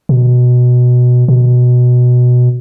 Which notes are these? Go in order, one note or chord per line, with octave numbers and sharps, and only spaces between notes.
B2
B2